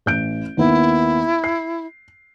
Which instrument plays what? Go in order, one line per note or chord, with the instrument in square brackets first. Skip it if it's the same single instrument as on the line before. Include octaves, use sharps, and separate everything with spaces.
[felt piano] A1 G6 D7
[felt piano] D#2 B3 [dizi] E4
[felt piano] C7